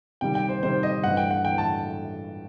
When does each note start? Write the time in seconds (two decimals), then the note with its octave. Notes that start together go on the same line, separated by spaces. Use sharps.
0.21 C3 D#3 G3 G5
0.35 G5
0.49 C5
0.63 C3 D#3 G3 C5
0.83 D#5
1.04 G2 E3 A3 F#5
1.17 G5
1.31 F#5
1.45 E3 A3 G5
1.58 A5